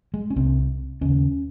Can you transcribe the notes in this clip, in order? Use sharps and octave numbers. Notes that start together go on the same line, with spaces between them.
G#3
C#4
C2 C3 C4
D#2 C#3 C#4